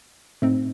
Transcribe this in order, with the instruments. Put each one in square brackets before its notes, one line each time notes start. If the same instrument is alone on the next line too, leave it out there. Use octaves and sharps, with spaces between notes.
[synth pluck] A2 A3 C4 D#4